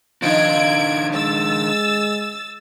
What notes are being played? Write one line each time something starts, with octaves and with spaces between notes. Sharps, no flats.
D#3 F3 D4 D#4 G#6 D7
G#3 E6 A6